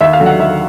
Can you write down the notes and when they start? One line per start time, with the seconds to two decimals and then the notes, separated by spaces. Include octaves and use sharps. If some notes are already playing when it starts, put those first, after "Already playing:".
0.01 D#2 E5
0.13 F5
0.20 D3 F#3
0.26 F#5
0.40 D#2 E5